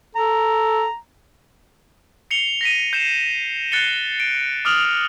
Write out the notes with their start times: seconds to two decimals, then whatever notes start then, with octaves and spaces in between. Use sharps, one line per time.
0.15 A4 A#5
2.31 C7 C#7 F7 G7
2.61 A#6 B6 D#7
2.93 G6 C7 E7
3.72 F#6 A6 C7 C#7 G7
4.20 D7
4.65 D6 D#6 F6 D7 F7 F#7